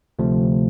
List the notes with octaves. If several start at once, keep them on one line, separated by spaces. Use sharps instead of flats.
D2 C3 F3 A3